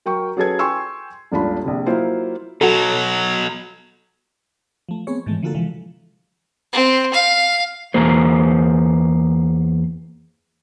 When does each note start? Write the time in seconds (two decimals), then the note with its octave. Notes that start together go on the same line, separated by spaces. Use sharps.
0.06 F#3 A#4 G5 C#6
0.37 F#3 C#4 G#4 A4 B4 G#6
0.59 G5 G#5 C6 C#6 E6
1.32 D#1 G#1 D4 F4 B5
1.64 A#1 C3
1.86 F#3 A#3 E4 F4 C5
2.61 B2 F#3 F#4 A4
4.89 F3 A3
5.07 B3 C4 G#4 C#5
5.26 G#2 D#3 E3 G#3 A3
5.43 D3 F3 A#3 F4 F#4 A4
5.54 C3 E3 F3 G#3
6.73 C4
7.13 F5
7.94 E2 A#3 C5